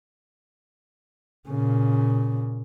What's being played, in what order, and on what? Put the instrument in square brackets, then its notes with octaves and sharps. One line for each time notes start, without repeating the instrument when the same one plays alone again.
[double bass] A#2 C#3